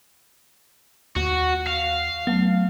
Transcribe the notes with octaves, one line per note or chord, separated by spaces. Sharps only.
D#2 F#4
F5
F#3 A3 B3